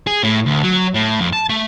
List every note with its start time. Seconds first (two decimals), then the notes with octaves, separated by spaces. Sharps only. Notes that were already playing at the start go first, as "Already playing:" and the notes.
0.07 G#4
0.23 A2
0.46 D2
0.63 F#3
0.94 A2
1.20 F2
1.33 A5
1.49 A3